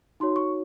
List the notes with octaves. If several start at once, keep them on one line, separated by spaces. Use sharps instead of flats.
D#4 F#4 C#5 C6
C#6